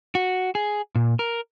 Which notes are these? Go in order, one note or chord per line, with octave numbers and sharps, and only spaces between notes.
F#4
G#4
A#2
A#4